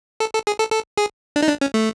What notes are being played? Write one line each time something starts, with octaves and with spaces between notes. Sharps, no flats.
A4
A4
G#4
A4
A4
G#4
D4
D#4
D4
C#4
A3